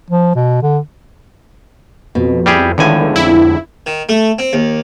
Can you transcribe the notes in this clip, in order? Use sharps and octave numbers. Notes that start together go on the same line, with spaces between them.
F3
B2
D3
F2 B2
G3 C4 E4 G4 G#4
E2 A2 D3 D#3 F3 G#3 G#5
F2 E4
D#3
A3
C4
D#2